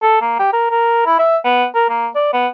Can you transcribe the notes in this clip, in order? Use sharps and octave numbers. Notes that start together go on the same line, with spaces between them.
A4
A#3
G4
A#4
A#4
E4
E5
B3
A#4
A#3
D5
B3